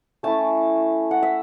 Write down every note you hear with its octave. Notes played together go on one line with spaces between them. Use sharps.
A3 C#4 E4 A5
F#5
E5